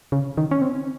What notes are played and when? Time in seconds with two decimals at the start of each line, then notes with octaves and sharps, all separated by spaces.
0.12 C#3
0.37 D#3
0.51 C#4
0.62 C4